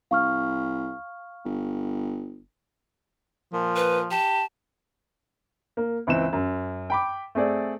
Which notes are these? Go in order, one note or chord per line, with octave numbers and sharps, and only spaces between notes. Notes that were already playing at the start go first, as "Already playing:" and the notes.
C2 F5 C#6 F6
G1
A#2 F3
B4
G4 A5
A#3
C#2 E3 C4 E7
F#2
G5 B5 D6
A3 C4 G#4 D5